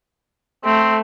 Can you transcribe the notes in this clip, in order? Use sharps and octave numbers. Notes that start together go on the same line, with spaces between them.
A3 C4